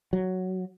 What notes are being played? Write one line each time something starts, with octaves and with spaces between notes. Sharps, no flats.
F#3